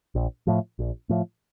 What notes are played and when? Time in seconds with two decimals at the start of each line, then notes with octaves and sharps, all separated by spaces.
0.15 A#1
0.47 A2 F3
0.79 A#1
1.09 A2 F3